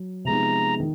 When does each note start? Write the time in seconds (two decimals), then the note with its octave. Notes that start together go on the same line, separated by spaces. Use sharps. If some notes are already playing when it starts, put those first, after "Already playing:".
Already playing: F#3
0.25 C3 F3 G#3 B3 D#4 A#5
0.80 D#3